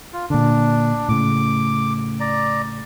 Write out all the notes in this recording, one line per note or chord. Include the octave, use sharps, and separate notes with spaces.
F4
A#2 D3 D4
A2 C#3 D6
D5 A#5